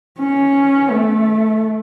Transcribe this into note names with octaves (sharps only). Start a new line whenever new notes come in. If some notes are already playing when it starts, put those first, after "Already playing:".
C#4
A3